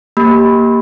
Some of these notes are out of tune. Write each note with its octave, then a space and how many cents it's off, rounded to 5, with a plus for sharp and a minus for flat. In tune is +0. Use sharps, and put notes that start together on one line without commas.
A#3 +0 G4 +0 B5 +0